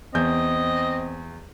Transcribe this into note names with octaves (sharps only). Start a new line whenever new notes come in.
E2 C4 D#5 G6